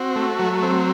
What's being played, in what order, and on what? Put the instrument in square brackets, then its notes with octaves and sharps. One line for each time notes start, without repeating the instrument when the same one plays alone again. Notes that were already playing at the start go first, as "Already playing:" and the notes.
Already playing: [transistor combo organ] C4 F#4
A3
F#3
C4